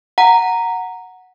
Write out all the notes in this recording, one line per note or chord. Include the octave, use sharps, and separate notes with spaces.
F#5 A#5